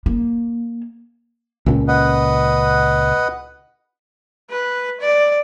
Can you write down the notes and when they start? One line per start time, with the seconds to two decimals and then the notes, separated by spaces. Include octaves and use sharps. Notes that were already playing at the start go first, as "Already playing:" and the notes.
0.06 A#3
1.66 C#2 A#2 C#4
1.88 B4 D#5 F#5
4.50 B4
5.00 D5